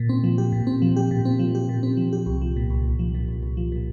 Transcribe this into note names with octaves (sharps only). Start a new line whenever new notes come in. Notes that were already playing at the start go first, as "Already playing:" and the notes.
Already playing: A#2
C4
F3
G4
A#2
C4
F3
G4
A#2
C4
F3
G4
A#2
C4
F3
G4
C2
F3
A#2
C2
C2
F3
A#2
C2
C2
F3
A#2